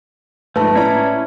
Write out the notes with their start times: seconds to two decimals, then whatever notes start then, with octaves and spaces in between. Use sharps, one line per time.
0.56 A#1 G#2 A3 B4 A5
0.75 A2 C#4 E4 D5 A#5